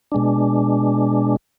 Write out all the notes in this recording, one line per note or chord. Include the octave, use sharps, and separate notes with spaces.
B2 G#3 D4